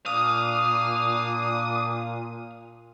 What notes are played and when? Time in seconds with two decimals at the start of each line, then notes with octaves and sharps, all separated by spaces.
0.06 A#2 A#3 D4 F5 D#6